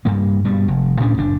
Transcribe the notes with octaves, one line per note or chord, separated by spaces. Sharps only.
G2 G3 A#3
G2 B2 G3
F1
D2 A2 C#4 D4
F#1 D4